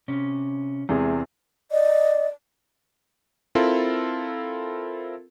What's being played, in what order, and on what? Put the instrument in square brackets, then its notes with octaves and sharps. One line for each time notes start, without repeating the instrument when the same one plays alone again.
[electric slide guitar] C3 C#4
[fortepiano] E2 C3 G#4 [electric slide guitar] G#3
[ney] D5 [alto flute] D#5
[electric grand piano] C4 E4 F4 A4 A#4